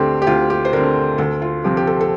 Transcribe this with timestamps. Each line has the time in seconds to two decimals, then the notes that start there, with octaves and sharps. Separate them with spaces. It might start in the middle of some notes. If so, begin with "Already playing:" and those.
Already playing: D2 D3 A3 C4 G4
0.22 G4
0.27 D2 F4
0.50 G4
0.65 C5
0.73 D3 A3 C4 A#4
1.18 D2 A4
1.42 F4
1.64 C3 F3 C4 G4
1.77 G4
1.87 A4
2.01 A4